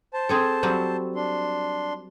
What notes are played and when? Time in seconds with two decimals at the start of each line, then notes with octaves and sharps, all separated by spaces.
0.14 C5 A5
0.29 C4 G#4 A4
0.63 F#3 G3 C4
1.16 D4 C6